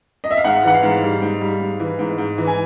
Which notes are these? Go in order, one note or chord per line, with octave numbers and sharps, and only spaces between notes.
D#5
E5
F5
G#2 F#5
E3 F#5
F5
G#2
G3
G#2
G3
G#2
E3
G#2
G#2
E3
G#5